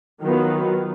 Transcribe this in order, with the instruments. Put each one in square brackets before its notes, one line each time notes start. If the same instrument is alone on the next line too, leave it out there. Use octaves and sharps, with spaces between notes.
[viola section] D#3 F#3 B3 F4